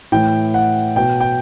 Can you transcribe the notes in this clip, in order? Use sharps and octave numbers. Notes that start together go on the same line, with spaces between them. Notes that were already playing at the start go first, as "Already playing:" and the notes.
A2 E3 G5
F#5
B2 G5
G5